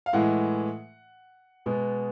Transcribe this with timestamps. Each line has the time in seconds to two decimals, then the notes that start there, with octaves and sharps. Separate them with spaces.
0.06 F5
0.13 A2 E3 G#3 F#5
1.66 B2 G#3 B3